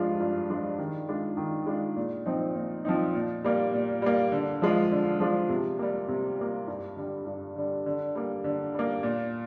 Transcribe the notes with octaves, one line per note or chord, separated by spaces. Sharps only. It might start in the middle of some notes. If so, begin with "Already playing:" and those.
Already playing: G2 F3 G#3 D4 F4
G2
F3 G#3 D4 F4
D#3
G#3 D4 F4
D#3
G#3 D4 F4
A#2
F3 C4 D#4
A#2
F3 C4 D#4
A#2
G3 A#3
A#2
G3 A#3
D3
F3 G#3 D4 F4
D3
F3 G#3 D4 F4
C3
G3 A#3
C3
G3 A#3
G2
D3 G3
G2
D3 G3
D3
G3 A#3
D3
G3 A#3
A#2